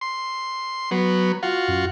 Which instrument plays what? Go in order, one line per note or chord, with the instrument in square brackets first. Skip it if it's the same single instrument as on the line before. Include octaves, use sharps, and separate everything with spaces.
[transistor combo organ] C6
F#3 B3
F4 F#4
[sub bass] F#2